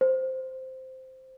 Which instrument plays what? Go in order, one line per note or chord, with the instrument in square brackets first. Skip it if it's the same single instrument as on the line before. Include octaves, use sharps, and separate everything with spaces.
[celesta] C5